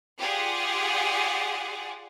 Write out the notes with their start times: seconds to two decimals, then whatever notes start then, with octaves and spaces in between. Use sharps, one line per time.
0.18 F4 G4 G#4 D5 F#5